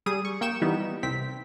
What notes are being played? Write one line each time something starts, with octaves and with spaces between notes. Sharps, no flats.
G3 G#4 D#6 D#7
C#6
A#3 G5 C#6 E7
E3 G3 B3 D#4
C2 C4 B6